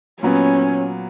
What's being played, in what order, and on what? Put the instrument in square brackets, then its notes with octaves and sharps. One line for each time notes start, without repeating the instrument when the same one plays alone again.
[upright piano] A#2 F#3 B3 [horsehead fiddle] C#4